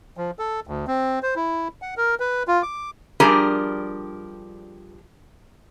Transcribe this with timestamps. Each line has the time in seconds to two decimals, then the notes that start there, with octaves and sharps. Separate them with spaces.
0.17 F3
0.39 A4
0.67 D2
0.87 C4
1.23 C5
1.36 E4
1.82 F#5
1.97 A#4
2.20 B4
2.48 F4
2.63 D6
3.20 F3 G3 D4 G4 G#4 A#4